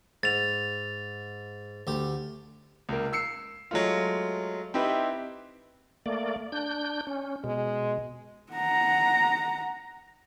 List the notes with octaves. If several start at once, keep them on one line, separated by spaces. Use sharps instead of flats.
G#2 A6 F7
D2 G4
C#2 A#3
E6 C7 C#7
F#3 G#3 A3 F4
C4 D#4 E4 G4 B4
A3 A#3 D5
D4 G6
C#4
B2 G#3
F#5 A#5